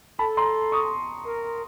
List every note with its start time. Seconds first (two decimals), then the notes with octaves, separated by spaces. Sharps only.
0.19 A4 A5 B5
0.37 A#5 C6
0.72 C#6 D#6
1.26 A#4